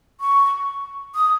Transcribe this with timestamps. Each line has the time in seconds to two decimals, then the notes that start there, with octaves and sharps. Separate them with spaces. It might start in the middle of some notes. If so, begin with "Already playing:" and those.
0.20 C#6
1.15 D#6